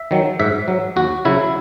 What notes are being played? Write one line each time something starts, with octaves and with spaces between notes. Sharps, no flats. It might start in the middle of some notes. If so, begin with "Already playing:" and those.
Already playing: E5
D#3 F#3
G#2 E5
F#3
D#2 F#4
C#3 F#3 E4